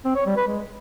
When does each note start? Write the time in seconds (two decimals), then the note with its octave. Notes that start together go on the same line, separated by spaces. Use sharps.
0.05 C4
0.15 C#5
0.26 G3
0.37 B4
0.47 G#3